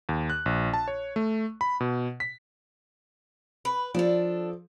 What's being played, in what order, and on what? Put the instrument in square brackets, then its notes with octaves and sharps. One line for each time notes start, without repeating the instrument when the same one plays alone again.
[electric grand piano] D#2
F#6
A#1
A5
C#5
A3
B5
B2
B6
[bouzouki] B4
[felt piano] F3 [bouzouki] D4 A4